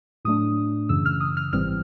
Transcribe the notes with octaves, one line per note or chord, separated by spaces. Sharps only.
A2 F#3 A3 D4 D#6
F#2 C#3 E3 E6
F6
D#6
F6
G#1 G#2 E3 G3 C4 F6